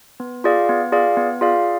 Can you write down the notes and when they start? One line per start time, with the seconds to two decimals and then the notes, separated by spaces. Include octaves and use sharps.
0.20 B3
0.44 F4 G#4 D5 F5
0.69 B3
0.92 F4 G#4 D5 F5
1.17 B3
1.41 F4 G#4 D5 F5